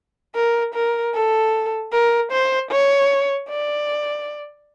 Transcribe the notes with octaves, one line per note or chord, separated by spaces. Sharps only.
A#4
A#4
A4
A#4
C5
C#5
D5